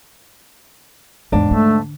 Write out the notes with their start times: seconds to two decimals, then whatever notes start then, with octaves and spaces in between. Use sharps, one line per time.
1.32 E2 G#2 D#3 D4
1.51 D3 A3